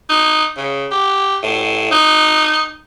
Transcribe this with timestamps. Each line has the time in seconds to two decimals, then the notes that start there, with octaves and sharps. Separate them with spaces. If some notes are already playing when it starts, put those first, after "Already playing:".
0.10 D#4
0.57 C#3
0.92 G4
1.43 A2
1.91 D#4